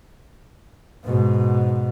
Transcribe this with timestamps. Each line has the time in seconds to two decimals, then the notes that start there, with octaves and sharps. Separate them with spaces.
1.05 G#2 B2